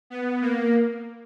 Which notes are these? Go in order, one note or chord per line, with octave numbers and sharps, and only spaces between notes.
B3
A#3